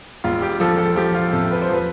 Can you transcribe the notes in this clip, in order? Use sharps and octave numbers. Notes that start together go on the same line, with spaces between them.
E1 F4
G4
F3 A4
A4
F3 G4
F4
C3 A4
B4
C5
F3 B4